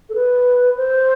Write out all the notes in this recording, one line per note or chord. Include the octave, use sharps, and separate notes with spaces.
A4
B4
C5